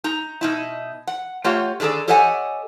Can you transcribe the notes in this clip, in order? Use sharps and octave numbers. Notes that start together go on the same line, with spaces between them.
D#4 A#5
B2 D#4 E4
F#5
A3 F4 G4 C#5 F#5
D3 D#3 G#4 A4 D5
G4 A4 C#5 D#5 F#5 G#5